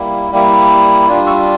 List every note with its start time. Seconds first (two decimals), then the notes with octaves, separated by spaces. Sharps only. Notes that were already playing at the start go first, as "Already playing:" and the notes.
Already playing: G3 A#3 E4
0.32 G3 A#3 E4
1.08 G3 D4 F4
1.27 C#6 E6